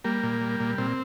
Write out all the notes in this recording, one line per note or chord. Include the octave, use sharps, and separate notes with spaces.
G3 A#3
A#2
G3
A#2
A#2 C4